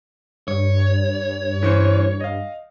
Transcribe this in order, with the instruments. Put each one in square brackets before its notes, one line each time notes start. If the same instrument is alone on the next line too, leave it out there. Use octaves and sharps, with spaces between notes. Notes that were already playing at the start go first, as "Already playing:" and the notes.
[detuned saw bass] G2 [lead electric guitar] C#5
[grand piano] E3 C#4 C5
D#5 F5